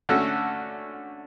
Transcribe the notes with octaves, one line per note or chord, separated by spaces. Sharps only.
D3 A3 C#4 F#4 A4